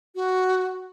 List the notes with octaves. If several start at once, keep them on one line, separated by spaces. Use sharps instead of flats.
F#4